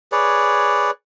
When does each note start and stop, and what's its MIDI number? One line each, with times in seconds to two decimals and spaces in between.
0.12 0.91 68
0.12 0.91 71
0.12 0.91 73
0.12 0.91 74